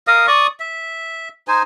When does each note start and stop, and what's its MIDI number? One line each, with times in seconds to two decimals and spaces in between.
0.07 0.27 70
0.07 0.27 75
0.07 0.27 77
0.07 0.27 87
0.27 0.47 74
0.27 0.47 85
0.27 0.47 87
0.60 1.29 76
1.48 1.63 63
1.48 1.63 72
1.48 1.63 80